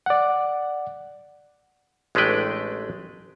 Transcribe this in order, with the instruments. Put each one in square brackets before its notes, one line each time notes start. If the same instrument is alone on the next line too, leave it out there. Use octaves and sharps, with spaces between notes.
[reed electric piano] D5 F#5
[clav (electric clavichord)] A1 G#3 A3 D4 B4 G5